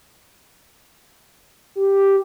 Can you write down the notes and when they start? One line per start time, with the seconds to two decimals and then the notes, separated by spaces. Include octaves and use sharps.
1.76 G4